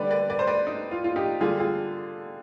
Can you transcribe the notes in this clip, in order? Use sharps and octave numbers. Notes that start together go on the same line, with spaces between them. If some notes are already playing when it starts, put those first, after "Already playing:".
Already playing: D3 G3 B4 D5
B4 D5
B4 D5
C5
B4 D5
D#4
F4
F4
D#4 G4
D3 G3 F4 G#4
F4 G#4